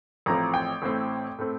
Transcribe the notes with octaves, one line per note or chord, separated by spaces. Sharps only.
A1 A2 F3 C4 A#5
G5
A1 A2 A3 C4
A2 A3 C4